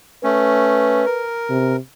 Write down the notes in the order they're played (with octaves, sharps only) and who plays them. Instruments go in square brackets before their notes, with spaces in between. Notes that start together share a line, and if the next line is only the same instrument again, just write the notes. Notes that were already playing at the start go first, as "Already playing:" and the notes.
[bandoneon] A3 C#4 [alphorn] B4
[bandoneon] A#4
[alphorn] C3